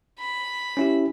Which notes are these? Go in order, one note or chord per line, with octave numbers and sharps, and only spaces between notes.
B5
C#4 E4 G4